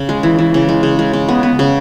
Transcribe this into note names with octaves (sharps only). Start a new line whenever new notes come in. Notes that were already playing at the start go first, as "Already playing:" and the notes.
Already playing: C#3
G#3
E3
E3
C#3
G#3
C#3
G#3
C#3
B3
B3
C#3